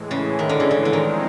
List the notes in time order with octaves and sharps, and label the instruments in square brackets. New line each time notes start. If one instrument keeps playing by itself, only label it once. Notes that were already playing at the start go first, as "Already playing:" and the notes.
Already playing: [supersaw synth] A2 E3 G#3
[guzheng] C#3
D#3
D3
C#3
D3
D3
[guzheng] D#3 [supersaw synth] F3 G#3 C4 D#4